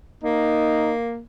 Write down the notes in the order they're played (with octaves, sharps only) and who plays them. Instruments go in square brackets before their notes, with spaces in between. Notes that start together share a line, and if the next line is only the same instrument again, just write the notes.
[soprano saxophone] A#3 [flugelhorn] D#4